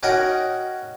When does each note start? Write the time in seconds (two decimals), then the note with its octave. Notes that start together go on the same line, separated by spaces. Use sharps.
0.03 C#4 D#4 F#4 A#4 D#5 G5